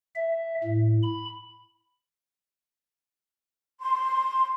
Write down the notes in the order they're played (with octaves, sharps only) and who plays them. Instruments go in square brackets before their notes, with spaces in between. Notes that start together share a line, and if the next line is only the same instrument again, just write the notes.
[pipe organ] E5
A2
B5
[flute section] C6